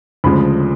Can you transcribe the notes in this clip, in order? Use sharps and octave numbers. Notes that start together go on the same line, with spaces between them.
D2 C#3 F3 G#3 B5